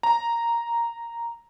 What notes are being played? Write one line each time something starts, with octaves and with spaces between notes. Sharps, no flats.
A#5